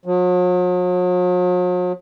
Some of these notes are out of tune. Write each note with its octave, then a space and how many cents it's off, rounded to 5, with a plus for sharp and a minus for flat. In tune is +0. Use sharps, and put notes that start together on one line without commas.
F#3 -45